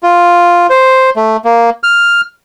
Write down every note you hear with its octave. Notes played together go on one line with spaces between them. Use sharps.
F4
C5
A3
A#3
F6